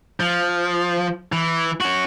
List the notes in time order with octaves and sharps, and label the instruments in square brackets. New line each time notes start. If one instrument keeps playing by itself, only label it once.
[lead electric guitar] F3
E3
C#4 F#4